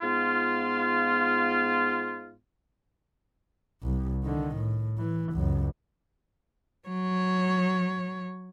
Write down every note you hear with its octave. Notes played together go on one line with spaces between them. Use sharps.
G#2 B3 F4
C2
D3 D#3
A2
E3
C#2 F#2
F#3 C#5